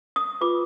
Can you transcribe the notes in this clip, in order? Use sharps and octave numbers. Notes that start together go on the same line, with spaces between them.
D#6
F4 G#4 B4 D6